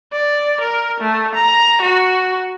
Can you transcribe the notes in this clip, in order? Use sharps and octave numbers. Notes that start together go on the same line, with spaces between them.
D5
A#4
A3
A#5
F#4